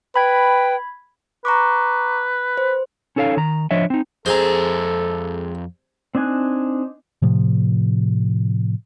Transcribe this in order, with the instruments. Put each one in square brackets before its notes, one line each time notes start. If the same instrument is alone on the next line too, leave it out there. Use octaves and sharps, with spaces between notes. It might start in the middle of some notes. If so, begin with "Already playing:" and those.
[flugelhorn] B4 [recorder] G5 [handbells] B5 G#6
[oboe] B4 [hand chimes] A#5 C#6 D6
[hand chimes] C5
[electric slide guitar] C#4 D#4 A4 C#5 F5
D#3 A#5
F3 D4 C#5 D#5 E5
C4 D#4
[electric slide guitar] F2 A#5 [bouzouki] G#3 [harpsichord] C4 G#4 C5 [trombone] A4
[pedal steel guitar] C4 D4 D#4 G#5 F#6
[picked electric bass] A2 C3 F3